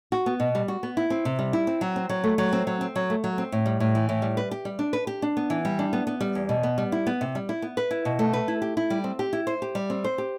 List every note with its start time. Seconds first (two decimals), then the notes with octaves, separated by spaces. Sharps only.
0.12 F#4
0.26 B3
0.40 B2
0.55 G3
0.68 F#4
0.83 B3
0.97 E4
1.10 C4
1.25 C3
1.39 G3
1.53 E4
1.67 C4
1.81 F#3
1.96 C4
2.09 F#3
2.24 A3
2.38 F#3
2.53 C4
2.67 F#3
2.81 C4
2.96 F#3
3.10 A3
3.24 F#3
3.38 C4
3.52 A2
3.66 G3
3.80 A2
3.95 E3
4.09 A2
4.22 G3
4.37 B4
4.51 G4
4.65 G3
4.79 D4
4.93 B4
5.07 G4
5.22 D4
5.37 B3
5.50 E3
5.65 G3
5.79 D4
5.93 B3
6.07 B3
6.21 G3
6.35 E2
6.49 B2
6.63 B3
6.78 G3
6.92 E4
7.07 B3
7.21 C3
7.35 G3
7.49 E4
7.62 B3
7.77 B4
7.91 E4
8.05 B2
8.19 A3
8.33 B4
8.48 E4
8.62 G4
8.77 E4
8.90 G3
9.04 C4
9.19 G4
9.33 E4
9.47 C5
9.62 G4
9.75 G3
9.90 C4
10.04 C5
10.18 G4